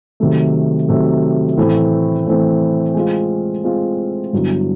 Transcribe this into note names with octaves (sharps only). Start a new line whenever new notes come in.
C3 D#3 F#3 A3
C3 D#3 F#3 A3
A2 E3 A3 C4 E4
A2 E3 A3 C4 E4
G#3 C4 F4
G#3 C4 F4
G2 D3 F#3 B3 E4